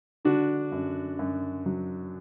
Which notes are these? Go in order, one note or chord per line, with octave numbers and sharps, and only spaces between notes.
D3 D4 F#4
F#2
F#2
F#3